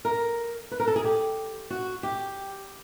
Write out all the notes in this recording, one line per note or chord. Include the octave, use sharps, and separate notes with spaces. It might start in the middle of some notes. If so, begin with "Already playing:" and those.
A#4
B4
A#4
A4
G#4
G4
F#4
G4